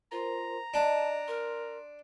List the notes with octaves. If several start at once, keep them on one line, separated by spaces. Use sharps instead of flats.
F4 A#4 C5 A#5
D4 D5 D#5 A5
A#4 C6